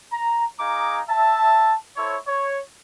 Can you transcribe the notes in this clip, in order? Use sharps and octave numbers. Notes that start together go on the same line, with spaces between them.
A#5
D#4 G#4 F5 A#5 D6
E5 A5
E4 A4 C5 C#5
C#5